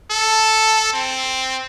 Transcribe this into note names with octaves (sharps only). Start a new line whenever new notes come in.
A4
C4